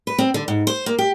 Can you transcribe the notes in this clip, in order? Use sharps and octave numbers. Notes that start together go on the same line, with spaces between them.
B4
C4
D3
G#2
C5
A#3
G4